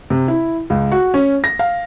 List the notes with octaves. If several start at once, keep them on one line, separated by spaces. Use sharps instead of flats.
C3
E4
C#2
F#4
C#4
A#6
F5